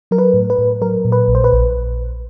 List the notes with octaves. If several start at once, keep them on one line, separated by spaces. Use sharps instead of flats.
F#3 A#4
B4
A2
B4
A2
F#3 A#4
A#2
B4
A#1
C5
B4
A#1